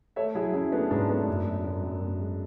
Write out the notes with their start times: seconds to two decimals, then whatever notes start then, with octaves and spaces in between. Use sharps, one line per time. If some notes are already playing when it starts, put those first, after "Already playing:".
0.16 A3 C#5 E5
0.35 F#3 E4 G#4
0.54 F#3 C#4 E4
0.72 A3 B3 D4
0.91 G#2 B3 D4
1.09 A3 B3 D4
1.28 F#2
1.46 F#2
1.64 F#2
1.83 F#2
2.01 F#2
2.21 G#3